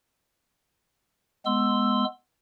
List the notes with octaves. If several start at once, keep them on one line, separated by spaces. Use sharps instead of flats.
G#3 B3 C6 E6